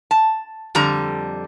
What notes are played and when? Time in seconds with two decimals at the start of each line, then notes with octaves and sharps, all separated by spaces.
0.11 A5
0.75 F2 D3 G3 A#5